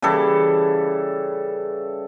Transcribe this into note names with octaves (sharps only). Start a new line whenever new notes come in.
C#3 E3 G3 A4